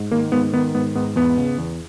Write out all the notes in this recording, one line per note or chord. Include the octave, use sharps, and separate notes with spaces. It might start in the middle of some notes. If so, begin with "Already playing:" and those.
Already playing: G#2
D#3 A#3
G#2 B3
D#3 B3
G#2 B3
G#2 B3
E2 B3
C#3
E2